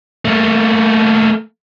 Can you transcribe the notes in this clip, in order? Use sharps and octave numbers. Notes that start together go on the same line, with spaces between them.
A3 A#3